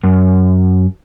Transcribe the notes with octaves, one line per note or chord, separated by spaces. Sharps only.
F#2